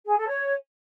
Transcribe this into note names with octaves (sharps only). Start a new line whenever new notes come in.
G#4
A4
C#5